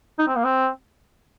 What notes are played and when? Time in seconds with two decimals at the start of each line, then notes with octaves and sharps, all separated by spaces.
0.19 D#4
0.28 C4
0.36 A#3
0.44 C4